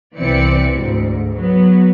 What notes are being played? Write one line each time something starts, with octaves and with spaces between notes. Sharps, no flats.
C2 E3 C4 D5 C#7
D2 G#2
F#3 B3